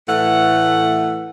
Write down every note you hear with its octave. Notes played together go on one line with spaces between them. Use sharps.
A2 E3 A3 F#5